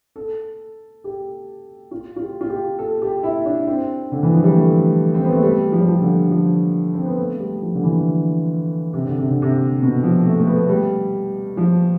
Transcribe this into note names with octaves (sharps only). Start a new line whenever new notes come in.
A4
G4
F4
F4
G4
F4
G4
A4
G4
E4
D4
C4
D3
E3
F3
G3
A3
C4
B3
A3
G3
F3
G3
F3
D3
F3
C4
B3
A3
G3
F3
D3
E3
C3
D3
C3
D3
C3
B2
F3
A3
A3
B3
G3
F3